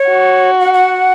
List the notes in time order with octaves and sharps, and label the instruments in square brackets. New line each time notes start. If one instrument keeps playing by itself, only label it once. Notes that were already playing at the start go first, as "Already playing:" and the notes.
Already playing: [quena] C#5
[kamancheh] F#4
[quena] F#5
F#5